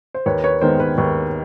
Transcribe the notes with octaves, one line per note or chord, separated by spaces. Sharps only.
C5
D#2 B4 C#5
B4 C#5
D#3 G#3 B3 A#4 C5
B4
D#2 B4